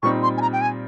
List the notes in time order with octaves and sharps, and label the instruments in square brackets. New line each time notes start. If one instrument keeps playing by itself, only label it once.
[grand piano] A#2 G3 C4 D#4 [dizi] C#6
[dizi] C6
G#5
A#5
G5
G#5